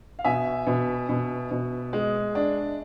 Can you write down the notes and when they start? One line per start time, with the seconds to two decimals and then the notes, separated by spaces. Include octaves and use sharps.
0.19 F5
0.25 B2 E5 G#5
0.67 B2
1.09 B2
1.51 B2
1.93 G#3
2.35 D4